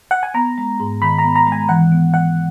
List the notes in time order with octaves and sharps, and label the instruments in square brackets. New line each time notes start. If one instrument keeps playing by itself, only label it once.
[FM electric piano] F#5
G#5
[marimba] B3 [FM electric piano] A#5
[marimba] G#3
G#2
[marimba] D#3 [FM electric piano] B5
[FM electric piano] A#5
[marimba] B3
[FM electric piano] A#5
[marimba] G#3 [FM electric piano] G#5
[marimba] E3 [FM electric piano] F#5
[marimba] B3
[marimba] E3 [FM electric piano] F#5